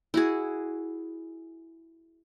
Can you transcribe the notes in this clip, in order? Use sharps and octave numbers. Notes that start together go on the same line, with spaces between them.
E4 F#4 G#4